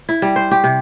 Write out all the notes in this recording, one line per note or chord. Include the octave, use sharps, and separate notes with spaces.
E4
G3
C5
G4
C3